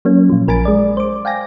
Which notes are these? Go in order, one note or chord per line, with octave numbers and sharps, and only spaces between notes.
F#3 A#3 C#4
A#2 F3
A#1 A#4 G#5 B5 A6 D7
G#3 D5
C5 D6
F5 G5 G#5 A#6